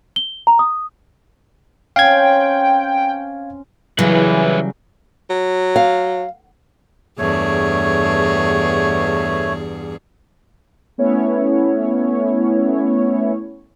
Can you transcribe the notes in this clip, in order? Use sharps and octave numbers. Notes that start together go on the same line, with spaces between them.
G7
A#5
D#6
C4 C#4 F5 G5 G#6
C#3 E3 F#3 G3 G#4 B4 C#5
F#3
F5
E2 G2 A3 G#4 C#5
A3 B3 C#4 E4 C#5